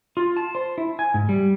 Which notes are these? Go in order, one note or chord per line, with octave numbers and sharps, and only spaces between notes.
F4
A5
C5
E4
G#5
G#2
G3